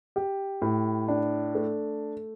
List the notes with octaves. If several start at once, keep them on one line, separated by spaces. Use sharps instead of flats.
G4
A2
D4
A3